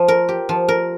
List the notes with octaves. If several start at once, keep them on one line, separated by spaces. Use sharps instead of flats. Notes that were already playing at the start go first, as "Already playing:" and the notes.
Already playing: F3
A#4
G4
F3
A#4